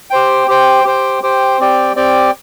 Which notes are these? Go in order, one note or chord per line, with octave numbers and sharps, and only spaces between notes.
G4 C5 G5
G4 C5 G5
G4 C5 G5
G4 C5 G5
C4 G4 D5 G5
C4 G4 D5 G5